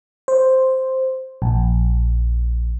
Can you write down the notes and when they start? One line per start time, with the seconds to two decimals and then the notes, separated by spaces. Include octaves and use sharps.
0.28 C5
1.42 A#1